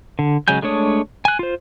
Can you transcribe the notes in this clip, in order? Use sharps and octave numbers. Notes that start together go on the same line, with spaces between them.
D3
C#3 F#3 G#3 G#5 G6
G#3 A3 D4 C#5 D#6
G#5 F#6
F4 C5